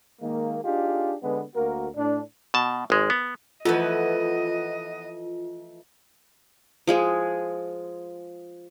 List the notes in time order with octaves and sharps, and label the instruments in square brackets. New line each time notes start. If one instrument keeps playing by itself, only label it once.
[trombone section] D#3 G#3 A#3
D4 D#4 F4 G4 G#4
D3 G#3 B3
D2 A#3 F#4 A#4
A2 D4
[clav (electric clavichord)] B2 A5
G#1 G#3
B3
[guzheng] E3 F3 A3 [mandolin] B3 B4 [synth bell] F4 [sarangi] D#5
[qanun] F3 G#3 G#4